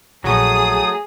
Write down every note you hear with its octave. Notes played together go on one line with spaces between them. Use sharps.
A#1 F#3 A3 G#4 D#6